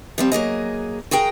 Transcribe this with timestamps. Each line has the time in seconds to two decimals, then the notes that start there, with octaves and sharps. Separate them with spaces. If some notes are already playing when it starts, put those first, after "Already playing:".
0.18 F3 G3 C4
0.32 F#3 A#3 G#4 D#5
1.11 F#4 G#4 A#4 G5